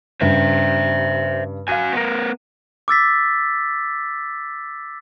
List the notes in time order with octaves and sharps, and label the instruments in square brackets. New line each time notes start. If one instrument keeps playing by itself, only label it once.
[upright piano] G2 C#3 D4 [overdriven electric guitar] C5 E5
[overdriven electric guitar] F#4 G#5 [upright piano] F5 D#7
[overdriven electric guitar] B3 A#4
[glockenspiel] D6 E6 A6 B6